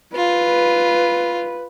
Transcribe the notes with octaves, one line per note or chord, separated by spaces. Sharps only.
F4 B4